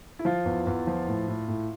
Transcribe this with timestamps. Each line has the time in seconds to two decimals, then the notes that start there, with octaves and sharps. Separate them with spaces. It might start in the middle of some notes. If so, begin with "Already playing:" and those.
0.19 E4
0.25 F3 F4
0.46 E2
0.67 E2
0.87 F3
1.08 A2
1.28 A2
1.48 A2